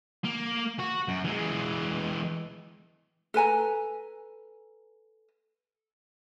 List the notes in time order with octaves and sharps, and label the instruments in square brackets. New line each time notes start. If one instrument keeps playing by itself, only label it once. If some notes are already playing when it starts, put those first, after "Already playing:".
[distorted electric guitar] A#3
F#4
F#2
E3 G#3
[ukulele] A4 B4 G#5 A#5